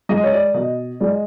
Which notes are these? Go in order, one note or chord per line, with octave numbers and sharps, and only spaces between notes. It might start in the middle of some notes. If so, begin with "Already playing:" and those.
G#3 D#5
C#5
D5
B2 D#5
G#3 D5
D#5